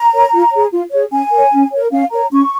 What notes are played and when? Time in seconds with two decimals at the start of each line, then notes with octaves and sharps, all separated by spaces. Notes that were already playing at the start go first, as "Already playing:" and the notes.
Already playing: A#5
0.13 A#4 C#5
0.32 F4
0.52 G#4 C#5
0.72 F4
0.92 G#4 C#5
1.12 C#4 G#5
1.32 A#4 C#5
1.52 C#4
1.72 A#4 C#5
1.91 C#4 F5
2.11 A#4 C#5 A#5
2.31 C#4 C#6